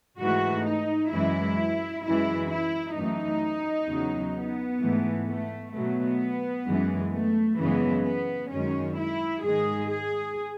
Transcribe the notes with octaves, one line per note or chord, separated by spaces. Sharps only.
G#2 E3 A3 F#4
D#4
F#2 E3 G#3 E4
F#2 E3 G#3 E4
E4
F#2 E3 A3 D#4
E2 C#3 F#3
B3
G#2 E3 A3
A3
B2 F#3 A3 B3
F#2 E3 G#3
A3
F#2 C#3 E3 G#3 B3
B3
F#2 D#3 G#3 C#4
E4
G#2 D#3 G#3 G#4
G#4